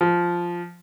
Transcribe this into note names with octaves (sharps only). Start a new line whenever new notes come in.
F3